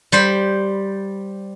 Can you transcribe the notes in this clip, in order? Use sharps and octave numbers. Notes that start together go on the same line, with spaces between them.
G3 C5 B5